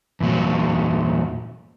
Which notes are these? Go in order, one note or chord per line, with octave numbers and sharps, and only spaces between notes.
E2 A#2 F#3